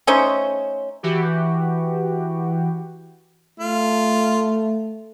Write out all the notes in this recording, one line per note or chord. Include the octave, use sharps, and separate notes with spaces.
A3 C#4 D#4 C5
E3 F#4 G4
A3 F4